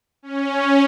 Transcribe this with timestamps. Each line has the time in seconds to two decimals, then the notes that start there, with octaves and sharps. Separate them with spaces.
0.23 C#4